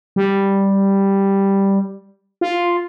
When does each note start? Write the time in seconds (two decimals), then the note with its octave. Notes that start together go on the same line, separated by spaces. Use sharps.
0.16 G3
2.41 F4